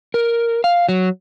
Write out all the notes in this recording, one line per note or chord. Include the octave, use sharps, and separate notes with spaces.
A#4
F5
F#3